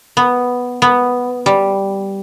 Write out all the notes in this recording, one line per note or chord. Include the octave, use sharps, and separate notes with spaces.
B3
B3
G3